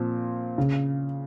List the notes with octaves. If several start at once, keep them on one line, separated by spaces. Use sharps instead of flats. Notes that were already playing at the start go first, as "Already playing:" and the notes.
Already playing: A#2 F3 C4
C#3